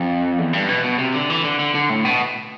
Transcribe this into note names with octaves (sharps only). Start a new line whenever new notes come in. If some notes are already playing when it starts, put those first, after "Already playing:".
Already playing: F2
E2
G2
B2
B2
C3
D3
E3
D3
D3
D3
A2
B2